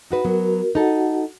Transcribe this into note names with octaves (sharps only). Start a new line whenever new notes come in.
D#4 F#4 B4
F#3 B3 F#4 A#4
D#4 F#4 A4 F#5